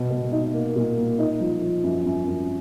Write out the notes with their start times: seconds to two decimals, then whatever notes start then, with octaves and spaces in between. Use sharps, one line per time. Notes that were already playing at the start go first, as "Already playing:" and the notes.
Already playing: B2
0.10 B2
0.32 D#4
0.54 A#3
0.76 A#2
0.97 A#3
1.19 D#4
1.40 F3
1.62 F3
1.83 F#2
2.06 F#2
2.28 F#2